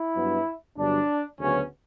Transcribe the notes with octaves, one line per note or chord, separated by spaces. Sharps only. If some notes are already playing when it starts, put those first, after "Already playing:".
Already playing: E4
G2 F#3 B3
G1 G2 F#3 D4
D2 C#3 F#3 B3 C#4